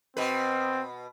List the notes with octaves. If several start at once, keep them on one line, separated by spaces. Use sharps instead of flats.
B2 C4 B4